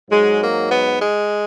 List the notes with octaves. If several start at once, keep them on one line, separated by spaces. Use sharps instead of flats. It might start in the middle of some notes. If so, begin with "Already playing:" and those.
G#2 F#3 G#3
A#3
B3
G#3